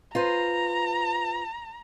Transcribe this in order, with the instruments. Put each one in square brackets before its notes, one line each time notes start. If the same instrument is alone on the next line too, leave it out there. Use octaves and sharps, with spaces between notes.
[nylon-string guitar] F4 B4 C5 [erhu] A#5